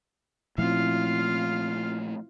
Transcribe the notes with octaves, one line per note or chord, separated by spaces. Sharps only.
A#2 F3 A3 C4 E4 F4 F5